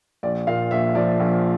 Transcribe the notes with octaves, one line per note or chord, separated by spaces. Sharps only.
A#1 D5
A#2 F5
A#1 E5
F3 D5
A#1